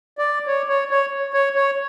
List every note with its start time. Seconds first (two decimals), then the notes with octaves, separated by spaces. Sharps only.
0.18 D5
0.47 C#5
0.69 C#5
0.91 C#5
1.34 C#5
1.56 C#5